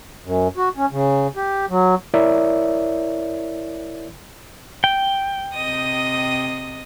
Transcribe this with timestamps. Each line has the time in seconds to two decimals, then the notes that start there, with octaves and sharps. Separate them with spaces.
0.24 F#2
0.57 F#4
0.77 C#4
0.91 C#3
1.36 G4
1.69 F#3
2.14 E4 A#4 C#5 D5 E5
4.84 G5
5.53 C3 D#5 D#6